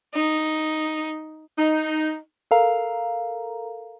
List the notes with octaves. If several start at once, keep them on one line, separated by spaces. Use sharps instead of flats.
D#4
D#4
A4 A#4 F5 A#5